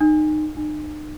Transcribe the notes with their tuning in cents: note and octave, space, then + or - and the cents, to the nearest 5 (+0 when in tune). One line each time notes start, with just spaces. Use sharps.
D#4 -25
D#4 -45